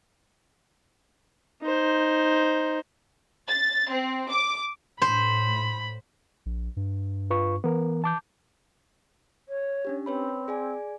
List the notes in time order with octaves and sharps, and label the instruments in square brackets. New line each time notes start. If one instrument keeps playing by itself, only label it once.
[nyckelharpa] D#4 C5
[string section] A6
C4
D6
[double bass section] A2 [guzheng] C5 [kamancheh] B5
[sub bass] A#1
G2
[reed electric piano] F4 B4 C#6
[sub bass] E3 [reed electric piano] B3 A#4
[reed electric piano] A5 D6 G6
[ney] C#5
[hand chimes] C#4 D4 G4
[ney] C4 [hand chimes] B4 C#5 B5
[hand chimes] G#4 D5 G#5